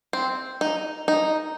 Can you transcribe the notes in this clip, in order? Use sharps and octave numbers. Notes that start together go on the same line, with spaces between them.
C4
D#4
D#4